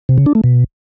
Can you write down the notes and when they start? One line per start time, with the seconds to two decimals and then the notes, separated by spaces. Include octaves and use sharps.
0.09 C3
0.18 C#3
0.26 D4
0.35 A3
0.44 B2